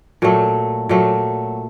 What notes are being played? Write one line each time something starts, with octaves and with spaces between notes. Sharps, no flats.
A#2 F#3 A3
A#2 F#3 A3